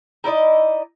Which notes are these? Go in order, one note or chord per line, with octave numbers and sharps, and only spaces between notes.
D#4 E4 D5 D#5